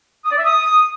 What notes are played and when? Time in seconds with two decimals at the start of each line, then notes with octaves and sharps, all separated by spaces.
0.25 D#6
0.31 D5
0.38 E5
0.44 D#6